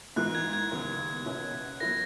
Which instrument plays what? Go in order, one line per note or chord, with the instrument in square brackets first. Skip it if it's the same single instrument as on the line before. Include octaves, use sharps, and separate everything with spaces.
[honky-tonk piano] G#2 E3 A#3 [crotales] F#6
[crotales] G#6
G#6
[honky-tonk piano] D#2 C#3 F#3 B3
B2 A#3 C#4 E4
[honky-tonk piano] F#3 B3 E4 B4 [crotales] A#6